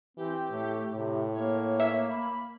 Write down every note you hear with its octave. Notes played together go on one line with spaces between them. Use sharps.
E3 C4 G4
A2 A3
A2 C3
A#3 C#5
E5
B5